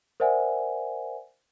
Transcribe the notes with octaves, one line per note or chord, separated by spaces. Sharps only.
A#4 C5 D5 E5 F#5 G#5